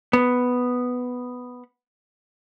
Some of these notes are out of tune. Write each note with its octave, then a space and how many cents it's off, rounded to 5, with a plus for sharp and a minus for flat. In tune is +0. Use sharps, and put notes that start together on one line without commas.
B3 +5